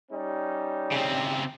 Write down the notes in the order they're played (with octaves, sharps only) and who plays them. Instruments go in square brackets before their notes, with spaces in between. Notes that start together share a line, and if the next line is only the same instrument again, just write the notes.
[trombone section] G3 C#4 D#4
[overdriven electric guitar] C#3 C4